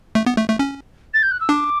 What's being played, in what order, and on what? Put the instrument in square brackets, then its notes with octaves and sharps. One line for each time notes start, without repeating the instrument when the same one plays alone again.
[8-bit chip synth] A3
B3
A3
A3
C#4
[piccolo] A6
G6
F#6
E6
[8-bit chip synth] D4 [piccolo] D6